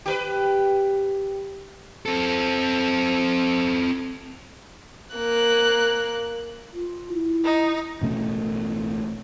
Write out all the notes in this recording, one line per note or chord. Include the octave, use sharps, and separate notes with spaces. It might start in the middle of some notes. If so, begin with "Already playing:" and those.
G4 A#4 B4
C4 A4
A#3 F#6
F4
E4
D#4
A1 B2 A3 C#4